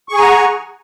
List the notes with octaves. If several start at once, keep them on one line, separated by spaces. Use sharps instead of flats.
G#4 F#5 G#5 A#5 C#6